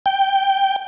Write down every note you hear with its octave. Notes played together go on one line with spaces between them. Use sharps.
G5